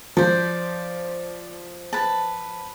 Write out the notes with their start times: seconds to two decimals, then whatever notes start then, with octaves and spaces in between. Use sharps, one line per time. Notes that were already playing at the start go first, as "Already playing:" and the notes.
0.17 F3 C5 D5
1.93 B4 A5